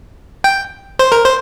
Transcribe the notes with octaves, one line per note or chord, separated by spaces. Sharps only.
G5
C5
A#4
C5